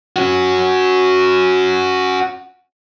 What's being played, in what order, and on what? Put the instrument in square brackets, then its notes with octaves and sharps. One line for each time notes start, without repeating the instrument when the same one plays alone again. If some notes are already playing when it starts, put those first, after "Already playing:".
[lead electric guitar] C#4 F#4